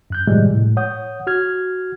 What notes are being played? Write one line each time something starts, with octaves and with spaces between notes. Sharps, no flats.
F#2 F#6 G6
A2 C3 D#3 F3 G3 G#3
A2
C#5 F#5 D#6 G6
F#4 F6 G#6